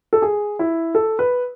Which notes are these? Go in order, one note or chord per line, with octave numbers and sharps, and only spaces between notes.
A4
G#4
E4
A4
B4